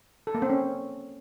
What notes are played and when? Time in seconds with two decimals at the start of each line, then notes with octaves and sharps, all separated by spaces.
0.27 A4
0.35 A#3
0.42 C4
0.50 C#4